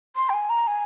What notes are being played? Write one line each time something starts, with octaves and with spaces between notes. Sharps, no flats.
C6
G5
G#5
A#5
G#5